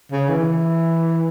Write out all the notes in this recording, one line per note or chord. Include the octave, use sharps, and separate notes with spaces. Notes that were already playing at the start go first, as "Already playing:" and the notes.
C#3
E3